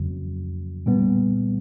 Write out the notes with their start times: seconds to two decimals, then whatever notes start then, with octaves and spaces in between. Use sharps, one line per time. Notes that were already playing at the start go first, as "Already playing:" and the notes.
Already playing: F2 C#3 F#3
0.86 A#2 G3 B3